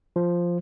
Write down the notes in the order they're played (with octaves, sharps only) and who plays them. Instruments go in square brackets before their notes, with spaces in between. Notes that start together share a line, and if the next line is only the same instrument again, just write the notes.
[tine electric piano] F3